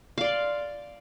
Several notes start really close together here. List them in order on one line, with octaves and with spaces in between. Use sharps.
F5 D5 C6